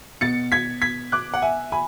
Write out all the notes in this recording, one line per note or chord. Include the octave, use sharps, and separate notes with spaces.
B2 A6 C#7
G#6 B6
G#6 B6
D6 F#6
F#5
E5 G#5
G#5 B5